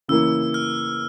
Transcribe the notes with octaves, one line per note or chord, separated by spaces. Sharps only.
C#3 E3 A#3 E4 E6
F6